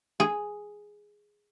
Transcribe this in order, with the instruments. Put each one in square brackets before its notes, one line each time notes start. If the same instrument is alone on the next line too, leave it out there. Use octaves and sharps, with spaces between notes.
[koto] G#4